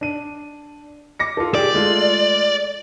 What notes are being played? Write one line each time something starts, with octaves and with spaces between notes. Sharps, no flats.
D4 D#7
D6 A#6 C#7
F4 A4
G4 G#4 D5
G#3 A3 F4